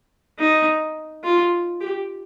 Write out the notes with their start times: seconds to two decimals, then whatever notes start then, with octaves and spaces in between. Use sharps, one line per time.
0.39 D#4
1.24 F4
1.81 G4